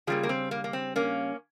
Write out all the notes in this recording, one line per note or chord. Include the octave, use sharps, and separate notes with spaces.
C#3 G3 A#3 F4 G#4
A#3
C4
A#3
A#3
C4
A#3 C#4